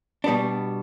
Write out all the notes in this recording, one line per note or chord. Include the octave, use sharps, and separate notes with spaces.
B2 G3 B3 D4